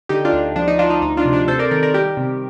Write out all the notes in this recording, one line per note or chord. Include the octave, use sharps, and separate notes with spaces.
D3 D#4 G4
D4 F4
D2
F3 D4
D#4
F3 D4 F4
D#4
D2 D#4
D4 F4
C3
D4 F4
C3 A4 C5
A#4 D5
D#3 A#4 D5
A#4 D5
G3 G4 A#4
C3